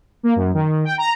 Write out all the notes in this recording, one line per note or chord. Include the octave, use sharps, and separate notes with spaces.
A#3
F#2
D#3
G5
A#5